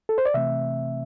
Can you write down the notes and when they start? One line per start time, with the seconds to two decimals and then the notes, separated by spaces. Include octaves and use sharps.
0.09 A4
0.18 C5
0.26 D5
0.34 C3 E3 A3 C4 E5